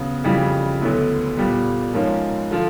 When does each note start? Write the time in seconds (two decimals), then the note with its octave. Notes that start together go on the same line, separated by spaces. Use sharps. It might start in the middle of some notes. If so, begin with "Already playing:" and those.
Already playing: C#3 F#3 B3
0.24 F2 C#3 E3 G3
0.81 D2 D3 F#3 B3 E4
1.37 A#2 G3 B3
1.93 G#2 F3 A#3 C#4
2.51 D3 F3